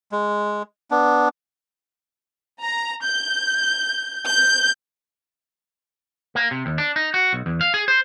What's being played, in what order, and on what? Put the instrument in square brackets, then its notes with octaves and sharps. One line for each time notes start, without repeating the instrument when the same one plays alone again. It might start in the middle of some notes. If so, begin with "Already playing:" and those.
[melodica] G#3
B3 D4
[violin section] A#5
G6
G6
[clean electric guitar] A#3
C3
D#2
D4
D#4
F#4
B1
E2
F5
G#4
C5